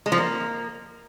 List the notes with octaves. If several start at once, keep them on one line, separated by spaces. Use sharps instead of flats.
G#3
F3
A#3